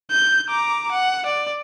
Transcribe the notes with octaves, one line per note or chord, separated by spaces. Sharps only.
G6
A#5 D6
F#5
D5